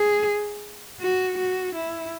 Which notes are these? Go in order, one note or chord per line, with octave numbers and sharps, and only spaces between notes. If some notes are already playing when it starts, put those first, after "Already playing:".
Already playing: G#4
F#4
F#4
E4